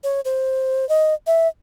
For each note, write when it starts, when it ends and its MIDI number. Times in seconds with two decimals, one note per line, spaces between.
0.04 0.21 73
0.25 0.88 72
0.89 1.14 75
1.27 1.48 76